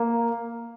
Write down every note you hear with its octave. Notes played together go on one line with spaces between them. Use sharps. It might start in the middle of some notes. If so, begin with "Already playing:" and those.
Already playing: A#3